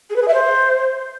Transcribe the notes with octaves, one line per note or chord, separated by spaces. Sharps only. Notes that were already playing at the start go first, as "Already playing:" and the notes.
G#4
B4
G#4
E5
C5